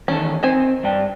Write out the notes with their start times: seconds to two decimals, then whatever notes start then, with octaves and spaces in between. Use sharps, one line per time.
0.08 E2 D#3 C#4 A4
0.43 D#3 C4 C5 G#5
0.84 G2 D5 G5